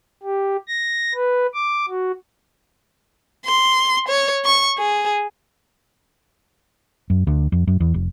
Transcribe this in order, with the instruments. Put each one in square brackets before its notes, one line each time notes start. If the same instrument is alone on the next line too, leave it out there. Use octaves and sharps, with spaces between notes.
[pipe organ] G4
A#6
B4
D6
F#4
[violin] C6
C#5
C#6
G#4
[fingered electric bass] F#2
D2
F2
F#2
E2
F1